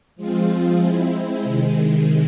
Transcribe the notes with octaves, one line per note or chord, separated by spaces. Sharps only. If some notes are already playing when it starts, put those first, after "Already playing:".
F3 G#3 C4 F4
G#3 C4 E4
C3 D#3 G#3